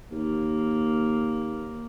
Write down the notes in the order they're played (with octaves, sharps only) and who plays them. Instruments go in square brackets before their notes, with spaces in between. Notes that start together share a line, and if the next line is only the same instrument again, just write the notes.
[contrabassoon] D#2 [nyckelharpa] A#3